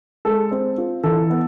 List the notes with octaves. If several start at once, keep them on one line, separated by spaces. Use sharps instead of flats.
G#3 A4
C4
F4
E3 A4
B3